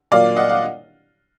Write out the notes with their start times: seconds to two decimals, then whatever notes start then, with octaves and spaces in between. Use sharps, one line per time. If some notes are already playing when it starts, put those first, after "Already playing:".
0.11 A#2 F#3 A#3 D5 F5
0.36 D#5 F#5
0.49 F5